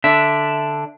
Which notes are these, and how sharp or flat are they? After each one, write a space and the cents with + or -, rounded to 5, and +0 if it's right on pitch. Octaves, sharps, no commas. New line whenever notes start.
D3 +0 D4 +0 E5 +0